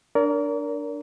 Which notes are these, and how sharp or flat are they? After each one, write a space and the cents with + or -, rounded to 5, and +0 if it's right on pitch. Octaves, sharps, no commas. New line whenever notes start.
D4 +0 A#4 +0 D5 -45